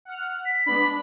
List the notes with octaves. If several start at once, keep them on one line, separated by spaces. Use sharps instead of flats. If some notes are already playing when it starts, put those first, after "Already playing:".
F#5 F6
B6
G#3 B3 D4 B5
D4